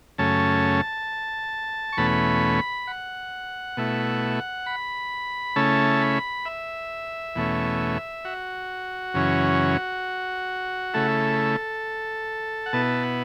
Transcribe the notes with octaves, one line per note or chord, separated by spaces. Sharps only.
F#2 C#3 A3 C#4 A5
C#6
E2 B2 A3 C#4 B5
F#5
B2 A3 E4
B5
C#3 A3 C#4 E4 A5
B5
E5
E2 B2 A3 C#4
F#4
F#2 C#3 E3 C#4
C#3 A3 E4 A4
F#5
B2 B3 E4 A5
F#5